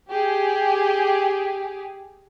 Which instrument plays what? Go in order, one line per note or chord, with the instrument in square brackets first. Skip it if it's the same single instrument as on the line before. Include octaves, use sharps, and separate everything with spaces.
[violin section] G4 G#4